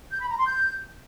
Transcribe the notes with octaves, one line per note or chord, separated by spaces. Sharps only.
G6
B5
A#5
C6
G6